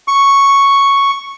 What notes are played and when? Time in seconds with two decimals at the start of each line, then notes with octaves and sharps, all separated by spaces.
0.08 C#6